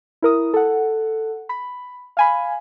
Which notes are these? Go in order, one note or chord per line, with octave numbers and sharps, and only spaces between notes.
E4 A#4 D#6
A4 F#5
B5
F5 G#5 B5